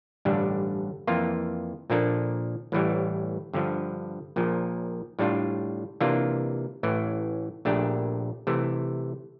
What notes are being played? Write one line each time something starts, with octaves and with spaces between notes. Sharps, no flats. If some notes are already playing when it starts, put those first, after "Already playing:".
A1 G2 D3 G3 D4
F2 E3 A#3 F4
A#2 F3 A#3 D4 A4
A1 A2 E3 G3
G2 D3 F3
A#1 A#2 F3
A2 G3 D4 F4
C3 E3 A#3 D4 F4
A1 A2 E3
A#1 A#2 A3 D4 G4
C3 E3 A3